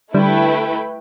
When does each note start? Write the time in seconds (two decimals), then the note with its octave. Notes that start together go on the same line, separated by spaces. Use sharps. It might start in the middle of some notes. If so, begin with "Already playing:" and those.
0.14 D3 G3 A3 E4 B4 G5